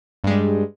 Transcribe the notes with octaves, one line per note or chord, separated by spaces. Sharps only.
G2 G3 G#3